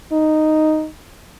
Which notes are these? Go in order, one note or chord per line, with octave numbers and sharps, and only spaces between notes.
D#4